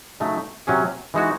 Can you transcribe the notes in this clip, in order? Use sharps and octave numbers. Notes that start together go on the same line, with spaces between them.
C#3 F#3 A3 D#4
C3 F#3 C#4 G#4
E3 G#3 D#4 F#4